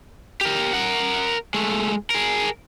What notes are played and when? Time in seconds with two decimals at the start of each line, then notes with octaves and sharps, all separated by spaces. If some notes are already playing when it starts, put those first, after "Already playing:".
0.41 G4 A#4
0.73 A#4 F#5
1.54 G#3 A3
2.10 G#4 A#4